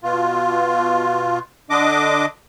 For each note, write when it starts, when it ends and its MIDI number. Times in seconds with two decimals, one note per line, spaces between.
0.03 1.39 47
0.03 1.39 65
1.70 2.26 50
1.70 2.26 62
1.70 2.26 75
1.70 2.26 86